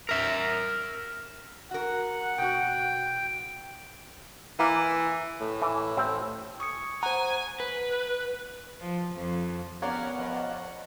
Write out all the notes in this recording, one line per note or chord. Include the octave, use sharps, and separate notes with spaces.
A#4 E5
F#4 A#4 F#5
B2 F#4 G5
E3 A#3
A2
E3
A1 C4
G#5 C#6 D#6 C#7
C5 F#5 G#5 A#5
B4
F3
F2
B3 C#4 G4 A#4 C#5 D5 F5 F#5
F2 F#5